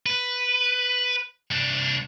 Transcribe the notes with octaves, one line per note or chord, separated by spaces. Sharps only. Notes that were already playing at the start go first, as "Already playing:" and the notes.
B4
C2 D4